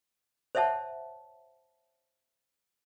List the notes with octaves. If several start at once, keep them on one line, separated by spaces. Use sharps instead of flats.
C5 C#5 E5 F#5 A5